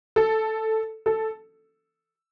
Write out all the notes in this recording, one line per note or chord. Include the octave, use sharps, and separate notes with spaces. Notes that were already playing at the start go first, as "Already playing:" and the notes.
A4
A4